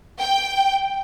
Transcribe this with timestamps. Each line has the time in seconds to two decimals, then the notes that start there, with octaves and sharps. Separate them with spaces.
0.19 G5